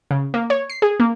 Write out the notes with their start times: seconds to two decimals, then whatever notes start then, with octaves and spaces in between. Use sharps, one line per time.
0.11 C#3
0.34 A#3
0.50 C#5
0.70 C7
0.82 G#4
1.00 A#3